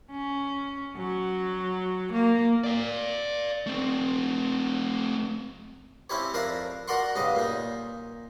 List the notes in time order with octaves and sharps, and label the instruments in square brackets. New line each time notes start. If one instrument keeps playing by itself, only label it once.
[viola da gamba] C#4
F#3
A#3
[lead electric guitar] D5 F5
A3 C4
[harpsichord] C4 C#4 E4 G4 C#5
F2 D4 A#4 E5 F5 A#5
F#4 A#4 D5 F#5 C6 C#6
B1 G2 C#3 G4 D#5
A#2 D#4